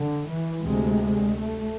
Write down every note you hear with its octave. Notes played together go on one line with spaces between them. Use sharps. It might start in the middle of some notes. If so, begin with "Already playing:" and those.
Already playing: D3
E3
D2 C3 G#3
A3